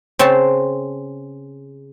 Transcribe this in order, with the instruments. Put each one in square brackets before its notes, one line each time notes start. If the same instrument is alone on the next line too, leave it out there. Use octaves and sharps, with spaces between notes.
[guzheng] C#3 C4 C#5 A5